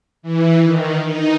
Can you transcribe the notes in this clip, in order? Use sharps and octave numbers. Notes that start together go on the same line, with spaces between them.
E3
D#3
D#4